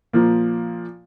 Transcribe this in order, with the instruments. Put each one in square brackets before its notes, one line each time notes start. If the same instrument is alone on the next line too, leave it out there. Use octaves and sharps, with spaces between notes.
[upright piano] A#2 F3 A#3